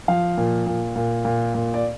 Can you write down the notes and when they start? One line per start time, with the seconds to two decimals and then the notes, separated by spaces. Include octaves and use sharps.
0.08 F3 F5
0.37 A#2
0.66 A#2
0.96 A#2
1.25 A#2
1.54 A#2
1.74 D5